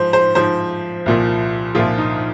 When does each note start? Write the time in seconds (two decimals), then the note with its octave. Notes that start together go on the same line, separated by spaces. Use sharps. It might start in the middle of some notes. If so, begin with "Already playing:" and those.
Already playing: G#2 F3 C5
0.13 C5
0.35 G#2 F3 C5
1.06 C2 A#2 F3
1.75 C2 A#2 F3 F4
1.98 D#4